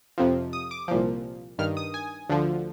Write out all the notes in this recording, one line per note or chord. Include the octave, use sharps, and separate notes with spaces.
F2 C3 F3
D#6
D6
C2 A#2 F3
G2 D#3 F6
D#6
G#5
D2 D3 F3